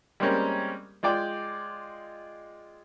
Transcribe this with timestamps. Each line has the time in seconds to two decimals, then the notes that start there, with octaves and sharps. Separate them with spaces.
0.20 G3 G#3 A#3 C4 C#4 A#4
1.03 G#3 F4 D5 G5